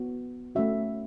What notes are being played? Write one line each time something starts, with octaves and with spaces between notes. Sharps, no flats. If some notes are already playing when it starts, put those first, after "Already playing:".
Already playing: B3 F#4
A3 C#4 F#4 E5